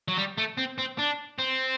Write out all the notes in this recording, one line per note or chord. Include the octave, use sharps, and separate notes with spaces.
F#3
G3
A3
C4
C4
D4
C4